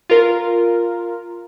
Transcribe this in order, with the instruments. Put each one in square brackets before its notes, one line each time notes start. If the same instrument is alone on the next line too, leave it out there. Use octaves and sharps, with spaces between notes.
[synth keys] F4 A#4